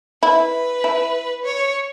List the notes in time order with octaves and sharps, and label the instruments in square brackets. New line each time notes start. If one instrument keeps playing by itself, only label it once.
[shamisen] E4 [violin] B4
[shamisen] E4
[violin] C#5